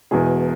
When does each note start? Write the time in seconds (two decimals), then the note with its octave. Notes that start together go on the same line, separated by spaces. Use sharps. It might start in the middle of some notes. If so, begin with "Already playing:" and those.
0.11 E1 E2 B2 G#4